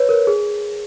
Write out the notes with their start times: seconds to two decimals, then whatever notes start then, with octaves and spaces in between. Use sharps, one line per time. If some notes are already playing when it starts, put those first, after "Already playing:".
Already playing: B4 C#5
0.09 A#4
0.27 G#4